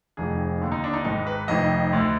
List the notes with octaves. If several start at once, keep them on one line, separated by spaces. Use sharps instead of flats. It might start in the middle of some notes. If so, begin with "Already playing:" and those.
F1 F2 D#3 G#4
D#2 D3
D#4
D4
D#4
G#1 G#2 D#3 D#4
B4
F1 F2 D#3 D#5
D2 D3